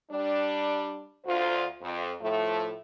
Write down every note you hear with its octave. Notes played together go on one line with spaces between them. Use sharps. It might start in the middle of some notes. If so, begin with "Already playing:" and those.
G3 D4
D2 F4 C5
F2
A2 F3 A3